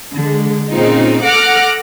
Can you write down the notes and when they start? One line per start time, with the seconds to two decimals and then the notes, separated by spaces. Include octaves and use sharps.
0.15 D3 G#3
0.70 A#2 C#3 C4 D#4 F4
1.23 A4 F#5 D6 F6 A#6